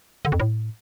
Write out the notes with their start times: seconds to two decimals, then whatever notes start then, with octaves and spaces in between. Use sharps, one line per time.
0.25 D3
0.32 F2
0.40 A2